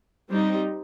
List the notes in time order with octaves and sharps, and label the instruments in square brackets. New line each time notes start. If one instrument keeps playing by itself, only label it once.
[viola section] G3 C4 D#4